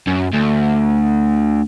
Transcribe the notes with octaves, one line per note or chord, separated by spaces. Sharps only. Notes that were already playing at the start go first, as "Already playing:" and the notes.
F#2
D2